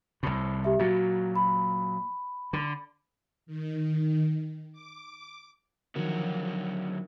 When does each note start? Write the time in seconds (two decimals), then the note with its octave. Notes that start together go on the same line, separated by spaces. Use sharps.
0.23 C2 A2
0.64 G4 E5
0.79 A#2 F#3 F#4
1.36 B5
2.53 D3
3.46 D#3
4.72 D6
5.96 D3 D#3 F3 F#3 F#4 A#4